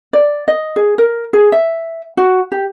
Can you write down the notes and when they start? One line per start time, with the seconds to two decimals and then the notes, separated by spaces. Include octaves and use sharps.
0.13 D5
0.48 D#5
0.76 G#4
0.98 A#4
1.33 G#4
1.52 E5
2.17 F#4
2.52 G4